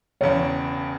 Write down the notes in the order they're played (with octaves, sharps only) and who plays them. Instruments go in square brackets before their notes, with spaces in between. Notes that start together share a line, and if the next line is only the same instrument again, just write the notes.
[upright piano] E1 E2 C#3 [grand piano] C#5